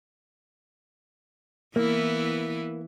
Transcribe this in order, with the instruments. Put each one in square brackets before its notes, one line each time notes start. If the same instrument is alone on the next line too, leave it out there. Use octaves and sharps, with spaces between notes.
[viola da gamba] E3 B3 E4 [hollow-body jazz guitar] A#3